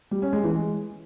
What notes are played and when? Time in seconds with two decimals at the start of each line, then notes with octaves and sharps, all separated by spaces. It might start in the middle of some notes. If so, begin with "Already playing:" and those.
0.11 G3
0.22 C#4
0.33 G#3
0.43 E3
0.54 G#3